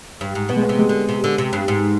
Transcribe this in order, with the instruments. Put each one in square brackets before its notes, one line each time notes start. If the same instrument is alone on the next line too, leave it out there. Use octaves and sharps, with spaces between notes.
[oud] G2
G#2
[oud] B2 [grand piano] B3
[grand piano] G#3
B3
[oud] C3
[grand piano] G#3
[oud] D3
C3
D3
C3
G2
G#2